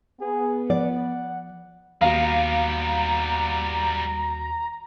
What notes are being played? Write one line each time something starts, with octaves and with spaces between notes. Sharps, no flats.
B3 G#4
F3 D5 F#5
D#2 G3 B3 F#4 F5 A#5